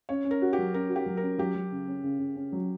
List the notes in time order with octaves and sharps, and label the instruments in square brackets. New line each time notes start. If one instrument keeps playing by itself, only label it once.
[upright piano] C#4 [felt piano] C#5
[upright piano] C#4
[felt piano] A#4
[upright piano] F#4
[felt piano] G4
[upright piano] F#3
[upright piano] C#4 [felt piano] A#4
[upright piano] F#4
[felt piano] G4
[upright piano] F#3
[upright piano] C#4 [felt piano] A#4
[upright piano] F#3 [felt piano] G4
[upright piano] F#3
C#3
C#4
C#3
C#3
C#4
F#3